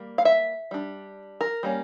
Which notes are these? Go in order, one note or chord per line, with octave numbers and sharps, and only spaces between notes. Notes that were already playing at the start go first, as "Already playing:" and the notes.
Already playing: G3 A#3
F5
E5
G3 D4
A#4
G3 A#3 C#4